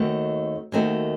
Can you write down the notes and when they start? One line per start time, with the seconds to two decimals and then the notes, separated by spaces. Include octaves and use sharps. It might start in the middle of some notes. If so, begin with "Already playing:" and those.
Already playing: D#2 D#3 A3 C4 F#4
0.72 D#2 D#3 A3 C4 F#4